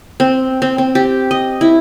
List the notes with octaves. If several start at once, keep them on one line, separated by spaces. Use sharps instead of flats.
C4
C4
C4
G4
D#5
E4